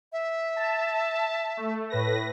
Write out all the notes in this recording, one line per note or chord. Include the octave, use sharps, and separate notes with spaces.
E5
A5
A3
A2 B4 A#6